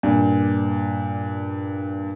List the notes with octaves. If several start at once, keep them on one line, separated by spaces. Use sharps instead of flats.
G2 A#2